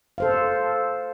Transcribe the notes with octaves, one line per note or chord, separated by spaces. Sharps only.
A4 C5 F5